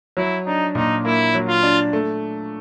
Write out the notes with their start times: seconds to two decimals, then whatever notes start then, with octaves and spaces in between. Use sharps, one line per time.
0.17 F#3 E4
0.46 D4 D#4
0.75 A#2 D#4
1.05 A#3 E4
1.35 F#3
1.48 F4
1.63 D4
1.93 A3